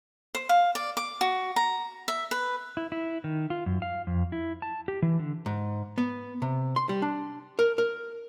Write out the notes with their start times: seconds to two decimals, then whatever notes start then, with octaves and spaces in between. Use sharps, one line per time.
0.35 C5
0.49 F5
0.75 D5
0.97 D6
1.21 F#4
1.56 A#5
2.08 E5
2.31 B4
2.77 E4
2.92 E4
3.24 D#3
3.50 F4
3.66 F#2
3.82 F5
4.07 F2
4.32 E4
4.62 A5
4.88 G4
5.02 E3
5.19 D3
5.46 G#2
5.98 B3
6.42 C3
6.76 C6
6.89 G3
7.02 D4
7.59 A#4
7.78 A#4